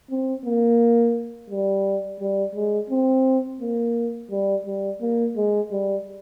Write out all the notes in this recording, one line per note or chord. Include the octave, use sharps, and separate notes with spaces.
C4
A#3
G3
G3
G#3
C4
A#3
G3
G3
A#3
G#3
G3